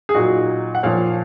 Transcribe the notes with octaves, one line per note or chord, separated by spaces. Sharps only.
G#4
A#2 F#3 D#4 F#4
F#5
A#2 F3 C#5 F5